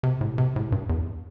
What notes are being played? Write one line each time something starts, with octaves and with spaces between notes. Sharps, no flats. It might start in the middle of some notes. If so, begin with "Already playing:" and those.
C3
A2
C3
A2
G2
E2